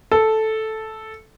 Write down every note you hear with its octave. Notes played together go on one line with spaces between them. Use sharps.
A4